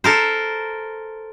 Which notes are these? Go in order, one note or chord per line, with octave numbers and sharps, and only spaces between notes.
A4 A#4 C5